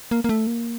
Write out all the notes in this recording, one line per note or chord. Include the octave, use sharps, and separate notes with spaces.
A#3
A#3
A3
A#3